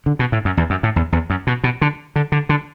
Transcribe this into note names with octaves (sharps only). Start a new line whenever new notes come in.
D3
B2
A2
F#2
E2
F#2
A2
E2
E2
F#2
B2
B2
D3
D3
D3
D3